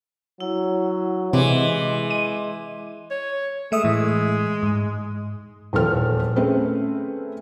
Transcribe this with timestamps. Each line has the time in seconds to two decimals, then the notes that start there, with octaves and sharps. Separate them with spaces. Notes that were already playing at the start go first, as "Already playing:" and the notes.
0.40 F#3 E4
1.33 C3 E3 G#3 D#5 C6 D6
2.10 D#7
3.11 C#5
3.72 G#3 A3 E5 D#6
3.84 A2 E3
4.63 G#2
5.73 D#1 E2 F3 A4 F6
6.36 A3 C4 C#4 G#4 B4